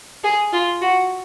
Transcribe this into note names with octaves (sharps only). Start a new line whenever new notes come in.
G#4
F4
F#4